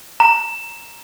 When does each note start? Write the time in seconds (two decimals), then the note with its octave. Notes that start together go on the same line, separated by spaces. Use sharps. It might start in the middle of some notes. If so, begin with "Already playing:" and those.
0.20 A#5